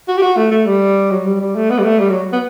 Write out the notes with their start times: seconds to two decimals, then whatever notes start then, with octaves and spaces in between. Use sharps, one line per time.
0.08 F#4
0.18 G4
0.22 F#4
0.37 A3
0.51 A3
0.66 G3
1.11 F#3
1.26 G3
1.41 G3
1.56 A3
1.70 B3
1.79 G3
1.84 A3
2.00 G3
2.10 F#3
2.33 B3